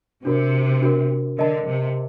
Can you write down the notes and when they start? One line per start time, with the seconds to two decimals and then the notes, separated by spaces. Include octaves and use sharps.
0.25 C3 D4 F#4 A#4
0.82 D4 F#4 A#4
1.38 D3 A#4 D#5 A5
1.67 C3